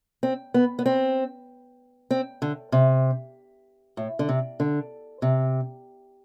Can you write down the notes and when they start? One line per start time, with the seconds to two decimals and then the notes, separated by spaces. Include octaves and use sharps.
0.23 C4
0.54 B3
0.79 B3
0.86 C4
2.11 C4
2.42 D3
2.72 C3
3.97 A2
4.19 D3
4.29 C3
4.60 D3
5.22 C3